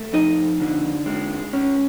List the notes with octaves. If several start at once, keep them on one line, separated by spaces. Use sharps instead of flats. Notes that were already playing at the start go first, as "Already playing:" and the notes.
Already playing: A3
F2 D#4 D#5
D3
G#3
C#4